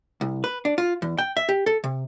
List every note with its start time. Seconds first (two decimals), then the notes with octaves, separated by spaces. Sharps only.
0.21 C2
0.44 B4
0.65 D4
0.78 F4
1.02 E2
1.18 G5
1.37 E5
1.49 G4
1.66 A4
1.84 C3